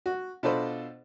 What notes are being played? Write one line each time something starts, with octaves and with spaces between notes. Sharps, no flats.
F#4
B2 D4 F4 A4 C5 B5